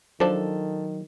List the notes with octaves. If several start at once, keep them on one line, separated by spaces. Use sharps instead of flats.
D#3 F3 F#3 D4 A4 C5